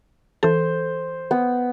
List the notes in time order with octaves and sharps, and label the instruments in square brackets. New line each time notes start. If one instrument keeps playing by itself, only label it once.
[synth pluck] E3 A4 [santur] C5
[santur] B3